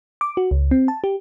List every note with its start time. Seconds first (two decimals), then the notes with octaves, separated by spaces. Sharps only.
0.21 D6
0.37 F#4
0.51 C#2
0.71 C4
0.88 A5
1.04 G4